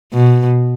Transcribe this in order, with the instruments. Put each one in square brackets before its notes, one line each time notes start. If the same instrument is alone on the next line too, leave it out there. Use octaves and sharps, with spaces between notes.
[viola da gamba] B2